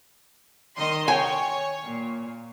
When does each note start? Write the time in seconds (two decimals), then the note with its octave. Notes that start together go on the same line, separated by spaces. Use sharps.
0.76 D#3 D#5 C6
1.08 C#5 G5 G#5
1.85 A#2